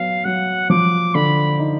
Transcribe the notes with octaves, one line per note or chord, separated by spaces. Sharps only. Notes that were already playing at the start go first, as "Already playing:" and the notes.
Already playing: F#3 B3 F5
F#3 F#5
F3 D6
D3 B5
D#4